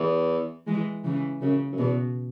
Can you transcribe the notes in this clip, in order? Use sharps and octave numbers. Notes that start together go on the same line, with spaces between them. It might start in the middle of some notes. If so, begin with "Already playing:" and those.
Already playing: E2
E3 G#3
C#3 E3
F#2 C#3
F#2
E2 B2